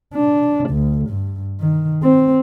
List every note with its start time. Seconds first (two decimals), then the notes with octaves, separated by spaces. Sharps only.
0.14 D4
0.70 D2
1.10 G2
1.60 D#3
2.03 C4